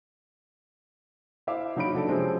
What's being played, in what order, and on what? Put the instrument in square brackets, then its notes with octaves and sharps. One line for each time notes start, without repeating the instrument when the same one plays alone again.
[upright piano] E4 C5 E5 F5 D6
C#3 F#3 D#4 C#5 B5 D7
F#3 D4 A4
C3 F3 G#3 C4 C#4